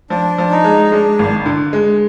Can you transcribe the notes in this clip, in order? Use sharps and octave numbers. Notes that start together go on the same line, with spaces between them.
F3 D4
F3
D#4
G#3
G#3 D4
G#1
D3
G#3